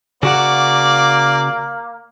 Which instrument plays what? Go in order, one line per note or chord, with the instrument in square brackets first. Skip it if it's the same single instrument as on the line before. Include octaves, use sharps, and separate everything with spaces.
[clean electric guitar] C#3 F#4 F#5 [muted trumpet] A#3 [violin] D5